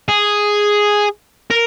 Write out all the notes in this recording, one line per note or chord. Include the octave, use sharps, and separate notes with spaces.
G#4
A#4